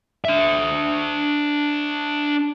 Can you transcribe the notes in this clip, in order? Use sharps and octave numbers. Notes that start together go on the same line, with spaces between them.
D4 E5